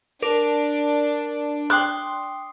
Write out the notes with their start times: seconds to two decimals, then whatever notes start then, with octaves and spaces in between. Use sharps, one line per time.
0.22 D4 A#4 D6 D7
1.70 G5 C6 D6 D#6 F#6 C7